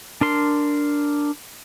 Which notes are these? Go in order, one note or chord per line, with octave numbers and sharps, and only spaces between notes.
D4 A#4 C6